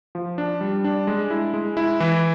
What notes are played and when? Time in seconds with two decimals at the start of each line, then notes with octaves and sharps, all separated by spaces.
0.15 F3
0.38 D4
0.61 G3
0.84 D4
1.07 G#3
1.30 E4
1.54 G#3
1.77 E4
2.00 E3